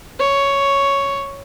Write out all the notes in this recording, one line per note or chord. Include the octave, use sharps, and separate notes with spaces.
C#5